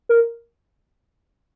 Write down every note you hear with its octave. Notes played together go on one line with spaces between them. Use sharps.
A#4